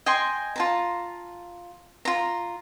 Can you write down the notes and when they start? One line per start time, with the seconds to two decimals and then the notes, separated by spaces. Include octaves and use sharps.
0.06 D#5 G5 G#5 C6
0.56 F4 A5 A#5
2.05 F4 A#5